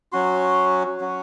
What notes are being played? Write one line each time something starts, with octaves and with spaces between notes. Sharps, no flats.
F#3 C#4 F#4 C6
F#3 C#4 F#4